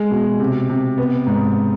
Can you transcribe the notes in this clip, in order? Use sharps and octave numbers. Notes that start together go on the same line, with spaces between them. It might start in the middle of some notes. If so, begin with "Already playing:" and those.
Already playing: G#3
B2
C3
C3
B3
G#2